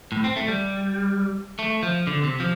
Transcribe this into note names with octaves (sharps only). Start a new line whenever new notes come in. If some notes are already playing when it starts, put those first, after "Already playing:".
A2
C4
A3
G3
A3
F3
D3
C3
F3